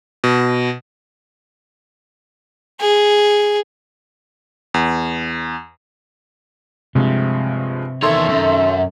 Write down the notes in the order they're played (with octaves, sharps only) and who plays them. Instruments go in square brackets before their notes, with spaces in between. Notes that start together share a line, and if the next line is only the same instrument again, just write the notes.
[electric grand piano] B2
[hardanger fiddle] G#4
[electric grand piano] E2
[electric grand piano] G2 F3 G#3 [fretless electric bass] C3
[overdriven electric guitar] E2 C#5 [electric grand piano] D#3 A4 C6 [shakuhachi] E5
[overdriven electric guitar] F#2